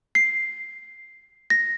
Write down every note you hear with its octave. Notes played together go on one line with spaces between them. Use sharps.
C7
A#6